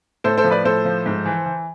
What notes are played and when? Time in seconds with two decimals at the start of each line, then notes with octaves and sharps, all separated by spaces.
0.24 A2 A4 C5
0.38 A4 C5
0.44 F3
0.51 B4 D5
0.64 A2 A4 C5
0.85 F3
1.06 G#2
1.26 E3
1.46 E3